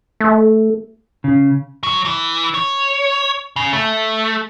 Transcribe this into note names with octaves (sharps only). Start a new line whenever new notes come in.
A3
C#3
F#3
E3
C#5
C#3
A3